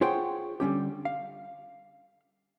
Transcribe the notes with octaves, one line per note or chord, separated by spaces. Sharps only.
F4 G#4 C5 C#5 F#5 G5
D3 G3 C#4 G4
F5